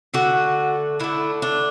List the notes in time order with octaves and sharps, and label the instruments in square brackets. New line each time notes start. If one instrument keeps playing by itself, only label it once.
[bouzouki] D3 A3 F#4
D3 A3 E4
D4